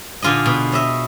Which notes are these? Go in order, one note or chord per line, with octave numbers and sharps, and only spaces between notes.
A#2 D3 F4 G#4 D#5
B2
C#5 D#5 E5